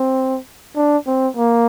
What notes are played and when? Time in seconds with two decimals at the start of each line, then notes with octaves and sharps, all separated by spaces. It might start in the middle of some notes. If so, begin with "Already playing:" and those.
Already playing: C4
0.76 D4
1.07 C4
1.37 A#3